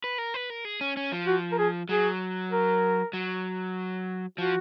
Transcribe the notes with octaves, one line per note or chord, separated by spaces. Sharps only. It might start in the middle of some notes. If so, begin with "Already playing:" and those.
B4
A#4
B4
A#4
G#4
C#4
C#4
F3
F#4
A#4
G#4
F#3 G#4
A#4
F#3
F3 F#4